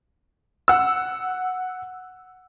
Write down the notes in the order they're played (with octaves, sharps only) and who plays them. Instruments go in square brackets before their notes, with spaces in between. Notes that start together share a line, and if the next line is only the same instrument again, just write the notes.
[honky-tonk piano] F#5 E6